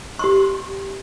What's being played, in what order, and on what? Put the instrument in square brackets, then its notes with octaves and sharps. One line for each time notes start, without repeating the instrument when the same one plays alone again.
[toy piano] G4 C6 C#6